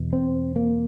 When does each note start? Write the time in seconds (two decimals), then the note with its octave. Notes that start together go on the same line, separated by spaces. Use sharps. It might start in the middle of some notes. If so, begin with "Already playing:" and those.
Already playing: E2 B2
0.13 C4
0.56 A#3